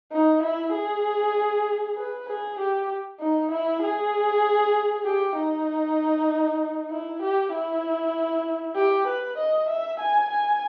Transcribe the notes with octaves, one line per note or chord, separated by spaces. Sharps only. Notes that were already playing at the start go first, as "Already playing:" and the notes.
D#4
E4
G#4
B4
G#4
G4
D#4
E4
G#4
G4
D#4
E4
G4
E4
G4
B4
D#5
E5
G#5
G#5